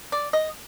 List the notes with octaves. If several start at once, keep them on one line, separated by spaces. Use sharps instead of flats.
D5
D#5